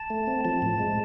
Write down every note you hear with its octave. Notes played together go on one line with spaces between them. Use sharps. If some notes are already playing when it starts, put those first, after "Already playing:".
Already playing: A5
A3
C4
F3 A5
A2
G#3